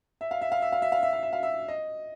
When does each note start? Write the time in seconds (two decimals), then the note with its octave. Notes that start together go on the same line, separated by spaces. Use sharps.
0.21 E5
0.31 F5
0.42 E5
0.52 F5
0.62 E5
0.72 F5
0.82 E5
0.92 F5
1.03 E5
1.13 F5
1.23 E5
1.33 F5
1.43 E5
1.68 D#5